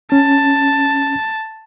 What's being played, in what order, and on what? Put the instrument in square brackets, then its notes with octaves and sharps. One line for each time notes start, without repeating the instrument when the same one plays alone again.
[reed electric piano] C#4 [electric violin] A5